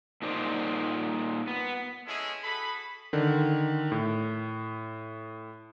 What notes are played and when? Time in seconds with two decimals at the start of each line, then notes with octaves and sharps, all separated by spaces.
0.22 A#2 D#4 C5 D5
1.47 B3
2.07 G#3 C#4 E4 G#4 A4 E5
2.43 F#4 G#4 A4 B5
3.13 D3 D#3
3.92 A2